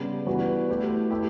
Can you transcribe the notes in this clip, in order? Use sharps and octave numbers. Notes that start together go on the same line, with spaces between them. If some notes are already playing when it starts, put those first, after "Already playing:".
Already playing: C#3 G3 B3
E3 G3 B3 F#4 B4
A3 E4 G4 B4
A3 E4 G4